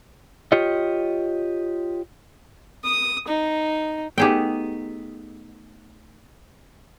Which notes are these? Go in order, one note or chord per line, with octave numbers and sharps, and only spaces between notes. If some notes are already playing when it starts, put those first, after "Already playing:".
F4 G4 C#5 D#5
D#6
D#4
A3 B3 D#4 G4 G#4 G5